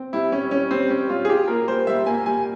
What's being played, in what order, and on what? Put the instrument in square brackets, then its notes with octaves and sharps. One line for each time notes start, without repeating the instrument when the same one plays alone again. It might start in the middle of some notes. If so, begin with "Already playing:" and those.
Already playing: [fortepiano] C4
[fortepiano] G3 [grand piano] E4
[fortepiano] G3 [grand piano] C#4
[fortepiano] G3 [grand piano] C#4
[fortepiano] G3 [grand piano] C4
[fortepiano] G3 [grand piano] C#4
[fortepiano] G3 [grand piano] F4
[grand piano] G#4
[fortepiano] F4 [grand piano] G4
[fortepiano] A#3 [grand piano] A#4
[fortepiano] G3 [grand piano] C5
[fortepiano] G3 [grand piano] E5
[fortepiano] A#3 [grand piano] G#5
[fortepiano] G3 [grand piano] G#5